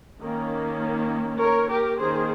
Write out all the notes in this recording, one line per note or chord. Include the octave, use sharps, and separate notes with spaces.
D#3 A#3 C#4
A#4 C#5
G4 A#4
D#3 A#3 C#4 G#4 C5